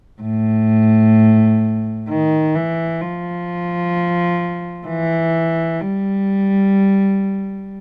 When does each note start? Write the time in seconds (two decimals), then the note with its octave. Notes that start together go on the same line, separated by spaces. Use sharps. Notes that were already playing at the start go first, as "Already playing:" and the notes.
0.22 A2
2.09 D#3
2.55 E3
3.01 F3
4.87 E3
5.81 G3